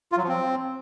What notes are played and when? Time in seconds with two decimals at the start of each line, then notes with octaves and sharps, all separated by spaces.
0.12 F4
0.18 F#3
0.23 F3
0.28 C4